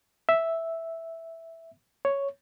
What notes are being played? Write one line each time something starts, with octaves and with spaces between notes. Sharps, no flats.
E5
C#5